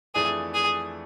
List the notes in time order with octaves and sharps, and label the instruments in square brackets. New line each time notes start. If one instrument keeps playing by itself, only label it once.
[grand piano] F2 E3 A3 D4 [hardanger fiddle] G#4
[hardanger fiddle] G#4